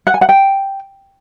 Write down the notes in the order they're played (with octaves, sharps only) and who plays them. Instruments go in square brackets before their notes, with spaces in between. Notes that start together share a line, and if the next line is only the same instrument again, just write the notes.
[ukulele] F#5
G#5
F#5
G5